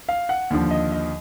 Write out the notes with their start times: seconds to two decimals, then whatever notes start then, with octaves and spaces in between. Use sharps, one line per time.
0.09 F5
0.29 F#5
0.50 D#2 D3 F3
0.71 D#5
0.92 D#5